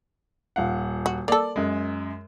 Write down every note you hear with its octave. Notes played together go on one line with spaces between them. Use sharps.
D#1 F5 F#5
F#4
A#3 A4 D5
F#2 G#3